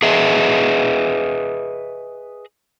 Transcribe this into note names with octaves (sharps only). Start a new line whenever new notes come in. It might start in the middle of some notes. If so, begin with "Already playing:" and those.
G#4 B4 D#5 E5